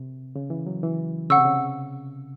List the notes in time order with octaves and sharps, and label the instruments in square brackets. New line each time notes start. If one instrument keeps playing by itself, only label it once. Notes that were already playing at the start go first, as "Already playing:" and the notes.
Already playing: [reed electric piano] C3
C#3
E3
F#3
E3
[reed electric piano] C#3 [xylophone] F#5 C#6 E6
[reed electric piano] C3
C#3